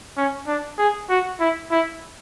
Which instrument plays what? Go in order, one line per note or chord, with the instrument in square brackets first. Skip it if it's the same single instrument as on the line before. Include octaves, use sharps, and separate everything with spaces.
[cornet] C#4
D4
G#4
F#4
E4
E4